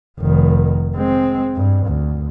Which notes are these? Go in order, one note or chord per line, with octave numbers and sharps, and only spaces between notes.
F1 D#3
G#3 C4
G2
D2